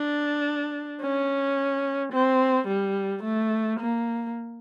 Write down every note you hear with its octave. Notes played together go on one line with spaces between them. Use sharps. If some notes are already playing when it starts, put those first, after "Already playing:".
Already playing: D4
C#4
C4
G3
A3
A#3